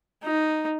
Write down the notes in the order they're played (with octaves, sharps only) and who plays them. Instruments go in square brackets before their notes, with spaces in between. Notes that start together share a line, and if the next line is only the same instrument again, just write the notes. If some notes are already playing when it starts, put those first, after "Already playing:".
[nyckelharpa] D#4